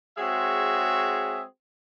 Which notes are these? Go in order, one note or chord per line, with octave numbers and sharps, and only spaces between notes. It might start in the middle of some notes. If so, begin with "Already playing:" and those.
G#3 C4 F#4 G#4 C#5 E5